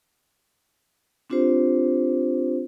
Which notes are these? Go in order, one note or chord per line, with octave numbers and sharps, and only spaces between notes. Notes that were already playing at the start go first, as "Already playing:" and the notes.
C4 D4 F4 G4 C5